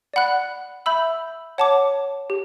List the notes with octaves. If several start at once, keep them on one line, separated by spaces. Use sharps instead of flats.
D5 F#5 B5 F#6
E5 B5 E6 G6
C#5 F#5 A5 D6
G4